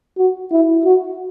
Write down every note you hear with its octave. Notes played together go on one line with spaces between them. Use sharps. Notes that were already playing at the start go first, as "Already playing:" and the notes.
F#4
E4
F#4